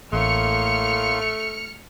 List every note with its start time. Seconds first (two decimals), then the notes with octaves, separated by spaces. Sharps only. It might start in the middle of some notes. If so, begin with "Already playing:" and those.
0.13 A1 A2 A3 A#3 C6 F6 C#7